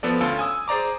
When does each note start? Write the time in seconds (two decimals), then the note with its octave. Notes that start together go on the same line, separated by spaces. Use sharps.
0.03 F3 B3 A4 D5
0.21 D2 C#4 F4 A4
0.39 G#5 D#6 E6
0.68 G#4 C5 D5 A#5 D6